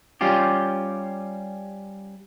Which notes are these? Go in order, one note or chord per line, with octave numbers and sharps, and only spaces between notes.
G3 C#4 F4 G4